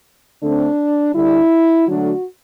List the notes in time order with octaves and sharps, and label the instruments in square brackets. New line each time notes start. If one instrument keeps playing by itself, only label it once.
[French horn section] D3 A3 C4 D4
D3 G3 D4 E4
D3 F#3 A3 D4 F#4